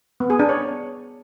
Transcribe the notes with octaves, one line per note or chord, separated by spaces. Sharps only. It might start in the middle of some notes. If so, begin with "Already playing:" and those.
B3
G#4
D4
C#5